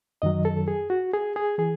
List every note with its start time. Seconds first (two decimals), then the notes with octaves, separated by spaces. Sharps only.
0.22 F#2 D#3 F#3 D#5
0.45 A4
0.68 G#4
0.90 F#4
1.13 G#4
1.36 G#4
1.58 E3 G#4